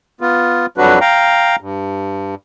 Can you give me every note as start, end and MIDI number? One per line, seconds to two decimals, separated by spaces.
0.21 0.66 59
0.21 0.66 65
0.78 0.99 41
0.78 0.99 54
0.78 0.99 55
0.78 0.99 62
0.78 0.99 66
0.78 0.99 71
1.01 1.56 77
1.01 1.56 79
1.01 1.56 82
1.61 2.35 43